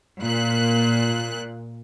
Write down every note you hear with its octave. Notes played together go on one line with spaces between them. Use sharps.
A#2 F#6